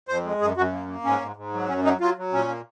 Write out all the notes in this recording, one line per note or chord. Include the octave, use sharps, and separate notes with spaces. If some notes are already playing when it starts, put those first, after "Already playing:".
F2 C5
G#3
F#2 G#4
F#2 F#4
A#3
A#3
G#2 C#4
G#2
G#2
F#3
F#2 C#4
F#3 D#4
F#3 F4
F#3
A#2 C#4
A#3